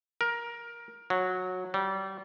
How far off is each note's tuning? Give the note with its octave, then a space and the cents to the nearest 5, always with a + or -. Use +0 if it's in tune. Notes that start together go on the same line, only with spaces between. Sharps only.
A#4 +15
F#3 -15
G3 -30